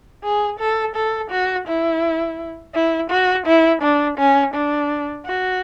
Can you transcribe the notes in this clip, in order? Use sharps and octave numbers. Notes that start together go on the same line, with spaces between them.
G#4
A4
A4
F#4
E4
E4
F#4
E4
D4
C#4
D4
F#4